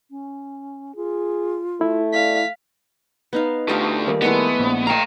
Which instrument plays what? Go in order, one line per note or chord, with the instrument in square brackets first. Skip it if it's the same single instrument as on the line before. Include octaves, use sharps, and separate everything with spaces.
[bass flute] C#4
[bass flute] F4 [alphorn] G#4
[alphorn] A3 [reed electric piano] E4
[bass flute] D5 [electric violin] F5 B6
[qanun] B3 D#4 F5
[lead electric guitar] D3 A3 [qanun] F4 G4 A4
[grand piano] D#3 G3 A#3
[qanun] G#3 A3 E4 [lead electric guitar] B3
[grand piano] A#1
[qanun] A3 C#5 F5 [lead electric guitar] G5 A#5